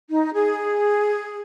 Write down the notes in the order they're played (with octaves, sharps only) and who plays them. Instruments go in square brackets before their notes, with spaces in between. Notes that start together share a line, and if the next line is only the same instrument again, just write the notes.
[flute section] D#4
G#4